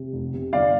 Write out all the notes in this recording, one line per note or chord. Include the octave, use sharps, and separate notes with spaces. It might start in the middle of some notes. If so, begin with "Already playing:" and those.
Already playing: C3
F1
C3
G1 D5 F5